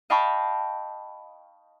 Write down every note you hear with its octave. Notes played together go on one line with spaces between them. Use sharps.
D#5 F5 G5 A5 B5 C#6